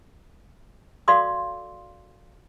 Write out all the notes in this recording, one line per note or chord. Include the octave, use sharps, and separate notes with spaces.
F#4 A4 D5 F5 C6 D#6